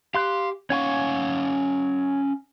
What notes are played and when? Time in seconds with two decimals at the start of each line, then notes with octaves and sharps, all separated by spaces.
0.15 G4 F5 C6 F#6
0.70 C#4 C#5 F5 F#5 G#5 C#6